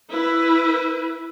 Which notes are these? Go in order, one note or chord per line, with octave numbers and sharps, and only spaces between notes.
E4 B4